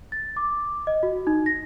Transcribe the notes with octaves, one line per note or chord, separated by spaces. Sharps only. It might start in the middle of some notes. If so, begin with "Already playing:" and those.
A6
D6
D#5
F#4
D#4
A#6